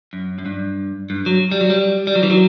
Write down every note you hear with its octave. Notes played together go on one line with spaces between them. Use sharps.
F#2
F#2
G2
G2
F#3
G3
F#3
G3
G3
F#3
E3
F#3